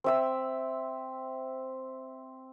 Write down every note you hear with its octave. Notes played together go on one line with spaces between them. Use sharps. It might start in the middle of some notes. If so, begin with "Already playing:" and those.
C4 E5 E6